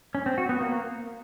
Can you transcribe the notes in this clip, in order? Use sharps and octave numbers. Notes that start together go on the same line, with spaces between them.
C#4
C4
F#4
B3
A#3